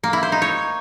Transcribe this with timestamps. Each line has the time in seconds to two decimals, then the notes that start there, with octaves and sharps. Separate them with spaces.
0.03 A#3
0.13 E4
0.23 C5
0.32 D#4
0.42 C#5